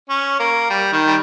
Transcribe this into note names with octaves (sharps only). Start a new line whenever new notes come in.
C#4
A#3
G3
D#3
G3